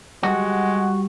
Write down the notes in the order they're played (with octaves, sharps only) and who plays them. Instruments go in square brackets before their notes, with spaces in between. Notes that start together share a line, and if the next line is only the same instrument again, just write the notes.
[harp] G3 [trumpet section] G#3 F#5 [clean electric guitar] F#4